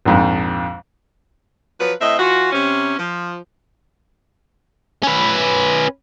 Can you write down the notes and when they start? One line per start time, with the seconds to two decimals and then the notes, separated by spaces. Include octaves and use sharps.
0.05 A#1 F2 G#2
1.79 F3 F#3 B4
2.01 A2 C4 D#5 E5
2.18 E3 F4 F#4
2.53 C3 C#4
2.98 F3
5.03 C#4 B4